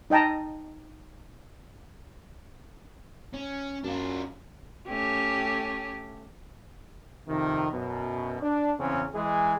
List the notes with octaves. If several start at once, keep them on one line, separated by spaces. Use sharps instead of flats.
D#4 D#5 G5 A5 A#5
C#4
F#2 D4 F4
A3 C#4 G4
F2 C3 D#3
F#2 B2
D4
E2 C#3 C4 C#4
E3 G#3 G#4